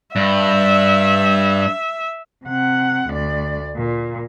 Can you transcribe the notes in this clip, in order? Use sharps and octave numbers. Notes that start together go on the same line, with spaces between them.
G2 E5
C3 F#5
D2 D5
A#2